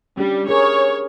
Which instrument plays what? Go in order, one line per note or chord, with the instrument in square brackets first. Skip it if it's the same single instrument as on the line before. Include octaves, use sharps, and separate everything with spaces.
[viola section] G3 [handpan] C#4 D4 G4
[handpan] G#4 A#4 [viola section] C#5